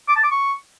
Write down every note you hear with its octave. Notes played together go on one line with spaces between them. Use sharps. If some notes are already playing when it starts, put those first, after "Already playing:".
D6
A5
D6
C#6